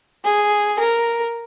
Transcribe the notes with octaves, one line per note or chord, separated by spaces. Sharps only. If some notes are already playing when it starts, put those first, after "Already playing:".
G#4
A#4